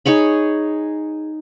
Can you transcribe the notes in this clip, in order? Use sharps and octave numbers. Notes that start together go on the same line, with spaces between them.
D#4 G#4 C#5 B5